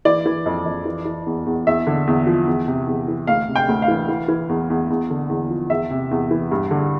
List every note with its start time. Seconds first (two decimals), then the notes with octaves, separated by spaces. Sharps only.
0.05 E3 D5
0.26 E3
0.46 F2
0.65 F2
0.85 E3
1.05 E3
1.26 E2
1.46 E2
1.67 E2 E5
1.87 D3
2.07 E2
2.27 F3
2.47 E2
2.68 C3
2.87 E2
3.08 E3
3.27 D2 F5
3.48 C3
3.56 G5
3.69 D2
3.82 F5
3.88 E3
4.08 E3
4.28 E3
4.49 E2
4.70 E2
4.90 E2
5.10 D3
5.29 E2
5.50 F3
5.70 E2 E5
5.91 C3
6.11 E2
6.31 E3
6.51 G2
6.71 D3